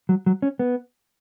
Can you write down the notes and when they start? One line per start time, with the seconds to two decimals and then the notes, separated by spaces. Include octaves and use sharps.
0.09 F#3
0.26 F#3
0.42 C#4
0.59 B3